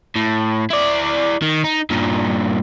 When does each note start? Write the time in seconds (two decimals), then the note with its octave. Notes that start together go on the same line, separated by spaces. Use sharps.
0.16 A2
0.70 E4 D5
1.42 D#3
1.64 D#4
1.90 G2 A#2